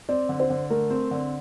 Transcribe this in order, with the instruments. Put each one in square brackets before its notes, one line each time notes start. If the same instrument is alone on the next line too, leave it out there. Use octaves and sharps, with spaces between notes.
[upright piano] C4 [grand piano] D5
[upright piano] D3
[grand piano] C5
[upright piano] D3
[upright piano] A3 [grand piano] A#4
[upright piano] C4
D3